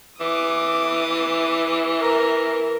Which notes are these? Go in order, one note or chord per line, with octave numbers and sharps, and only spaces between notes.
E3 D6 D#6
A#4